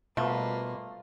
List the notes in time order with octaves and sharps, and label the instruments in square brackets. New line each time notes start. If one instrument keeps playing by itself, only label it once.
[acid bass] B2 [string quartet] G3 A#3 B4 [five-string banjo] A3 [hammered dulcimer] F4 C5